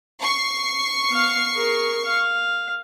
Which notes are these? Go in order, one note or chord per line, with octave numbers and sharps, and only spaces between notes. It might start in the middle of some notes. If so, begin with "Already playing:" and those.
C#6 C7
B3 F5
G#4 A#4
F5